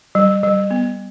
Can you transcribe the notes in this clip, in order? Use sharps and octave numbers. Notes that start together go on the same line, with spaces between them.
G3
G3
B3